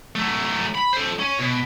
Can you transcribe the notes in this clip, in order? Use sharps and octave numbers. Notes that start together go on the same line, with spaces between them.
F#3 A3
B5
A4 C5
C#4
B2